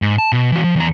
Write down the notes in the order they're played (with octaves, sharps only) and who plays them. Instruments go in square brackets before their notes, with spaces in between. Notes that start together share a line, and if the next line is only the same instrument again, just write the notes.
[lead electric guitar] G#2
A5
B2
E3 F#4
F3
E2 A#5